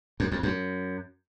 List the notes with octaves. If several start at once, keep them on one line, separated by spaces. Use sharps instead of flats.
F#2
F2
F#2